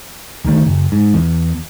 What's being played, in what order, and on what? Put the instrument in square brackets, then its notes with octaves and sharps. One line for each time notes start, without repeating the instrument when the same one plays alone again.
[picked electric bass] D2 D#3 A3
F#1
G#2
E2